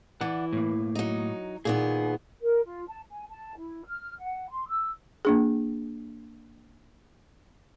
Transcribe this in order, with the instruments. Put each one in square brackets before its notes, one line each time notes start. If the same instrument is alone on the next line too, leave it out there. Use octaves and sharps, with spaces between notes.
[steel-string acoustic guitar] E3 [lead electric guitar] D5 F#5
[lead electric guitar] A2 A#3
[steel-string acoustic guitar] F#3 D#4
[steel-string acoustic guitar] A#2 D#3 B3 [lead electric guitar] G#4
[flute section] A#4
F4
A5
G#5
A5
E4
F6
F#5
C6
E6
[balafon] A#3 D4 G#4